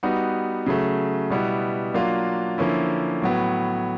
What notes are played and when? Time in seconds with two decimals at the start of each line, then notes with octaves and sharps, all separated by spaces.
0.03 G3 B3 D#4 F#4
0.66 C#3 F#3 A3
1.30 B2 G3 B3 E4
1.94 F#3 A#3 D4 F4
2.58 D3 F3 A#3 C#4 E4
3.22 A2 F#3 B3